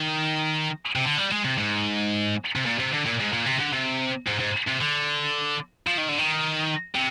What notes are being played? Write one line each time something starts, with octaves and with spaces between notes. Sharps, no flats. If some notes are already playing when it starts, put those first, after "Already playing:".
Already playing: D#3
C3
D3
G3
G#3
C3
G#2
C3
A#2
C3
D3
A#2
G#2
A#2
C3
D3
C3
G#2
G#2
C3
D3
F3
D#3
D3
D#3
C3